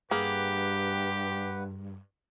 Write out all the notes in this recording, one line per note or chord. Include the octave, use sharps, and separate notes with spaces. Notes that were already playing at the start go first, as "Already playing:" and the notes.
G2 A#3 G4 G#4 B4 F#5